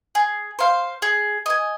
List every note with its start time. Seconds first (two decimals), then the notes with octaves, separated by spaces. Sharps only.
0.15 G#4
0.59 C5 F5
1.02 G#4
1.46 D#5 G#5